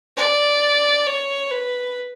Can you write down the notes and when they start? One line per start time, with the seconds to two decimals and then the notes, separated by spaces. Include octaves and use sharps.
0.17 D5
1.07 C#5
1.51 B4